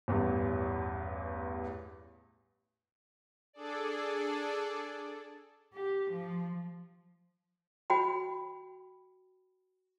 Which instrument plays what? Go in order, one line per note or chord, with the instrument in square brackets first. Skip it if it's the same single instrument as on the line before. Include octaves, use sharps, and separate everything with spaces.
[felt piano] A1 E2 G2
[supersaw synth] D4 G#4 A4 D5
[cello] G4
F3
[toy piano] F#4 G5 B5